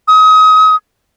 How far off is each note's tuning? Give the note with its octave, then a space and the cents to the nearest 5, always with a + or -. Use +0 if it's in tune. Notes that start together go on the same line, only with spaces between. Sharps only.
D#6 +30